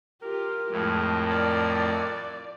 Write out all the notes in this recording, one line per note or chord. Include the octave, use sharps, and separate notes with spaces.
F4 G4 A#4
F2 A2 G#3
D5